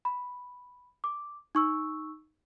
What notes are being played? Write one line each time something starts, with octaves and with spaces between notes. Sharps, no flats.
B5
D6
D#4 C#6 E6